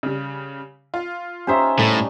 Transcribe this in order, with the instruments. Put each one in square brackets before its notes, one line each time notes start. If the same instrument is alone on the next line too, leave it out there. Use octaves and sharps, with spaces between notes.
[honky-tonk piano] C#3 G3
F4
[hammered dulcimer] C#4 D#4 [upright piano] G4 C5 E5
[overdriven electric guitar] A2 [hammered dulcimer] G3 [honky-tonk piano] A3